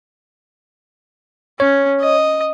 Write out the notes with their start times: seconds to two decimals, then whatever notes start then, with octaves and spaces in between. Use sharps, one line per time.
1.60 C#4 C#5
2.01 D#5